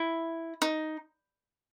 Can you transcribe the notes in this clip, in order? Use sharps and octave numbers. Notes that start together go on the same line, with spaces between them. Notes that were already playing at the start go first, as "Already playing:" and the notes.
Already playing: E4
D#4